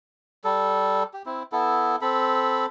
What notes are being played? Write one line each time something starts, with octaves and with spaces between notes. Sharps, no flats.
G3 A4
G4
C4 E4
B3 E4 A4
C4 A4 B5